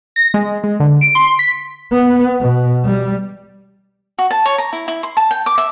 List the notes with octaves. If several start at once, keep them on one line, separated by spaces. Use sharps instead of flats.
A#6
G#3
G#3
D3
D7
C6
B6
B3
B2
G3
F#4
A5
C#5
A#5
E4
E4
C6
A5
G5
D6
E5